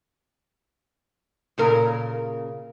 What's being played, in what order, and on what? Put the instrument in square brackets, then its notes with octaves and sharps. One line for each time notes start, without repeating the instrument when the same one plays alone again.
[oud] A#2 C#3 A#4